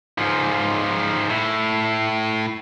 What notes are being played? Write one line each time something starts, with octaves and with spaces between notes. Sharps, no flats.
G#2 F3
A2